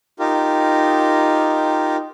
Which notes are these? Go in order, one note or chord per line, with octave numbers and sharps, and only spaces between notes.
D#4 F4 G4 A#4